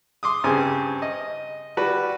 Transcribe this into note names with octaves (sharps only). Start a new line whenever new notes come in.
C6 D6 D#6
G2 C#3 C4 G#5
D#5
G3 F#4 B4 D5